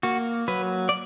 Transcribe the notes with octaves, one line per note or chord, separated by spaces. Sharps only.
A#3 F#4
F#3 B4
D5